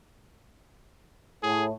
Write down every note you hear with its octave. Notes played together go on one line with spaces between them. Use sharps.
A2 G#4